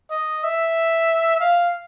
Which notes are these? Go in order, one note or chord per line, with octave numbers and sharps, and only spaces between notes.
D#5
E5
F5